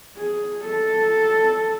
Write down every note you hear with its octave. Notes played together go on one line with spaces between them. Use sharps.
G#4
A4